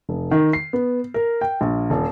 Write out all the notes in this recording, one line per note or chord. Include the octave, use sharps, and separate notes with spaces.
F1
D#3
C7
B3
A#4
G5
A#1
D#1